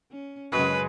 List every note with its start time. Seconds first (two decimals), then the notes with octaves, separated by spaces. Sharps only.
0.11 C#4
0.52 F#2 C#3 G#3 F#4 G#4 B4